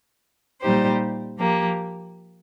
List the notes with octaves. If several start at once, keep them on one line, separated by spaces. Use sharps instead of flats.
A#2 G3 D#4 G4 C5
F3 A#3 G4